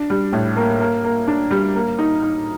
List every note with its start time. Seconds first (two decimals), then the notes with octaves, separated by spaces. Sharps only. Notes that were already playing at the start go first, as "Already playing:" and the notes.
Already playing: D4
0.10 G3
0.33 A2
0.56 A#3
0.80 A#3
1.04 A#3
1.28 D4
1.51 G3
1.75 A#3
1.99 D#4
2.22 D#4